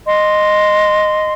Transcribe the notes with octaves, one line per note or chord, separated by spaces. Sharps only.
D#5 C6